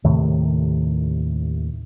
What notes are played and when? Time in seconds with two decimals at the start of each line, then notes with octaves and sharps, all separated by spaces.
0.04 D#2 A2 C3 D#3